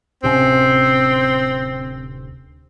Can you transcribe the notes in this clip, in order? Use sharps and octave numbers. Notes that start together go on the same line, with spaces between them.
D1 C3 C4 C#4